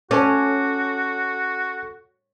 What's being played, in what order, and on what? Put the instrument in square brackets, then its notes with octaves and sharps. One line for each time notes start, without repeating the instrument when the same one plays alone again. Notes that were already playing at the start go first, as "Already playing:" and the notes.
[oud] C#4 [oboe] F#4 [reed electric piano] A4 D6